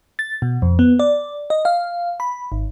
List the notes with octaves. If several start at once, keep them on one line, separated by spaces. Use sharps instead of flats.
A6
B2
F2
B3
D5
D#5
F5
B5
G#1